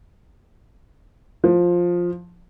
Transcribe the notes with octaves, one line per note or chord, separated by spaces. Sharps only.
F3